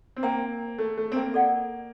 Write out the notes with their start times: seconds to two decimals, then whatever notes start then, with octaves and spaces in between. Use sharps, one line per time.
0.16 C4
0.23 A#3 C5 G5 A#5
0.78 A3
0.97 A3
1.12 C4
1.16 A#3
1.34 A4 D5 F#5